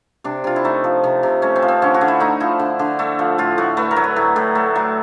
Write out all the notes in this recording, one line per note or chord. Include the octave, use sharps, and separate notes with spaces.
C3 D4
C3 F4
E4
A3 D#4
F3
C3
C3
A3 C#4
C4
F3
C4
D3 C#4
F#4
D3
E4
A3 D#4
F3 E4
D3
D3
A3
F3
A2 F4
A2 F#4
A3 B4
A#4
F#3
B4
A2
A2
A3
F#3